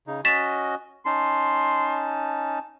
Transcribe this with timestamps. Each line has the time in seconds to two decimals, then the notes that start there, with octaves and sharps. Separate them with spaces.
0.07 C#3 D#4
0.25 C#4 F#4 D#5 A6 B6 E7
1.06 C#4 D#4 A5 C6